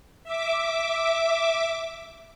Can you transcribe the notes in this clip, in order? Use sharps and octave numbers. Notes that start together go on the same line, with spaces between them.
E5 D6